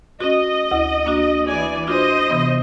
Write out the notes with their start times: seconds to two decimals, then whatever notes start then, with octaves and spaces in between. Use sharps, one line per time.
0.21 C#4 F#4 D#5
0.71 D2 E4
1.06 A#3 D4 F#4
1.47 E3 D5 G#5
1.87 D4 F4 F#4 C5 D#5
2.30 C3 E3 B3